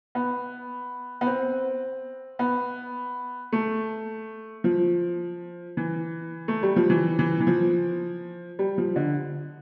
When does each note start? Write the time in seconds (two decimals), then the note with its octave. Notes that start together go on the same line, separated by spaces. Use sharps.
0.15 B3
1.21 B3
1.26 C4
2.39 B3
3.52 A3
4.64 F3
5.77 E3
6.48 A3
6.63 G3
6.76 F3
6.90 E3
7.19 E3
7.40 E3
7.47 F3
8.59 G3
8.78 F3
8.96 D3